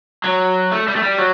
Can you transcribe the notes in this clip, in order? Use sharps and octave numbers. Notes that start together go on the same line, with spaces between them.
F#3
A3
G3
A3
G3
F#3